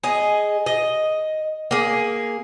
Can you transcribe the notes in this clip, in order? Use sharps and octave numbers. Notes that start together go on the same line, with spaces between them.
G#4 D#5
D#5
A#3 G#4